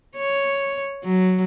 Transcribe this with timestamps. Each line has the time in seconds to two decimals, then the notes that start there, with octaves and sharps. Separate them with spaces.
0.17 C#5
1.04 F#3